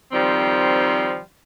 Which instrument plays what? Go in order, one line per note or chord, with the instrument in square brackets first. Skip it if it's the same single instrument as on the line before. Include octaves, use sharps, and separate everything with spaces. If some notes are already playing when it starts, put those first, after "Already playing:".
[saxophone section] D#3 F3 G3 C4